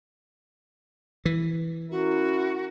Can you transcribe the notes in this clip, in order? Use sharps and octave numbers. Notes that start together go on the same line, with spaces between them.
E3
C#4 E4 F#4 A#4